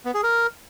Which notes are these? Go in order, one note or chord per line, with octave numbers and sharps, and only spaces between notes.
B3
G#4
A#4